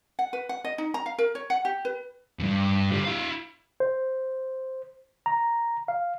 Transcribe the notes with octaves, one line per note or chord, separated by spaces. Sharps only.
F#5
B4
F#5
D#5
D#4
A#5
F5
A#4
C#5
F#5
G4
B4
E2 G2
D3 G3
E4 F5
C5
A#5
F5